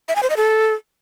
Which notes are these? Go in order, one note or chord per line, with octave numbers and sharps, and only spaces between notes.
E5
G#5
C5
D#5
A4